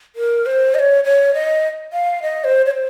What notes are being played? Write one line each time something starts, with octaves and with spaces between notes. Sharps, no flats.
A#4
C5
D#5
C#5
C#5
D#5
F5
D#5
C5
C#5
C5